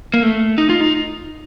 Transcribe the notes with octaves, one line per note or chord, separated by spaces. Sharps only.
A#3
A3
D#4
F4
D#4